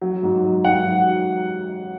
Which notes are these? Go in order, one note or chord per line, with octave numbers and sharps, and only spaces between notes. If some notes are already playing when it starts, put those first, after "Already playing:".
F#3
G#2
F#3
G#2 F#5
F#3